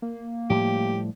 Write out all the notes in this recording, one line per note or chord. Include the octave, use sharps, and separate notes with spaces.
A#3
A2 F3 G3 G4